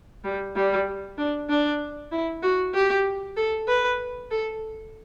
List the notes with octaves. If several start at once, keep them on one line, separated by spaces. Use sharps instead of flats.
G3
G3
D4
D4
E4
F#4
G4
A4
B4
A4